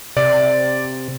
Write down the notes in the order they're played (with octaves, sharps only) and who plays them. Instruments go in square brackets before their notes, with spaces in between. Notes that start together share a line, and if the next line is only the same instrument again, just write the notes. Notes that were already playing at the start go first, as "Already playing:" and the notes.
[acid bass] C3 [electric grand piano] D5